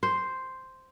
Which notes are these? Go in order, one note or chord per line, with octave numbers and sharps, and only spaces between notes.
C5